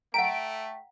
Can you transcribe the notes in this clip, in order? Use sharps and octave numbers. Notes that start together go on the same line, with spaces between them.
A3 F#5 G5 A#5 B6 D7